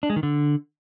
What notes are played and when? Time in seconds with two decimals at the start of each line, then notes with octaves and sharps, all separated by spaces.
0.03 D4
0.10 G#3
0.16 D#3
0.23 D3